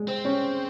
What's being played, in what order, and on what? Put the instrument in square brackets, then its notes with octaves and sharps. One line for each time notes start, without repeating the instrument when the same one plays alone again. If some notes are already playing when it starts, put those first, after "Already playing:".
Already playing: [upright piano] G#3
[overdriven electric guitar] C4
[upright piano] C#4